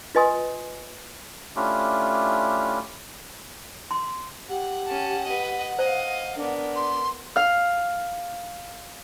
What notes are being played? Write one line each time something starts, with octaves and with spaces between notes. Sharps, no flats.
F4 B4 D#5 G#5 C6 D#6
A3 C#4 D4 E4 F4 G4
C6
G4 F#5
C#4 A5
B4 D#5
C5 D#5 F5
B3 D4 A#4
C6
F5 F6